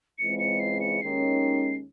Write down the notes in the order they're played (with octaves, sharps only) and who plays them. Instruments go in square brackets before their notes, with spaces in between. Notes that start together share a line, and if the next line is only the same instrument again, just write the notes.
[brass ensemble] C#2 C#3 E3 G#3 C4 [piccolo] C#7
[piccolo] C#7
C7
C#7
[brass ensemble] D#2 D#3 G#3 C#4 [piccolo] C7